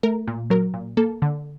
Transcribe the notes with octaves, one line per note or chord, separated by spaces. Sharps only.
A3 A#4
A#2
F#3 A#4
A#2
A#3 A4
D3